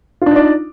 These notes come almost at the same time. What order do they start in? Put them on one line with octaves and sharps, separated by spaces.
F4 D4 D#4 D5